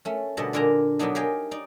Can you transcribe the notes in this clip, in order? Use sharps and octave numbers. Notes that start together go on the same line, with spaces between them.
A3 C#4
B2 D3 G3 D#5 F#5 A5
A#2 D3 D4 A#4 G#5 A#5
B2 D3 F#3 B3 D4 D#4
G4 A#4 D#5 F5 G5 G#5
D#4 D5